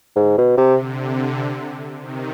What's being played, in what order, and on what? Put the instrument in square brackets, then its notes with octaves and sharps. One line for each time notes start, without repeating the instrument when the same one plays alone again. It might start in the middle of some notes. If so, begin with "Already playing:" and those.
[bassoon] G#2 [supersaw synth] D3
[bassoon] B2
[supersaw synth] C3
[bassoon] C3
[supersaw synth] D3
C3 D#3